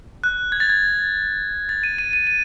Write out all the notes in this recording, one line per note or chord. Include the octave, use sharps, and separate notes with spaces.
F#6
G#6
A6
G#6
A6
D#7
D#7
D#7
D#7